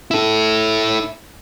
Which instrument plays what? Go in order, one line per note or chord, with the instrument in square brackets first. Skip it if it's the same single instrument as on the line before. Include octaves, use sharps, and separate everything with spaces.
[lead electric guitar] E4 A4